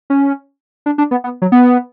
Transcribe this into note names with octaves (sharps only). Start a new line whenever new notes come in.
C#4
D4
D4
B3
B3
F#3
B3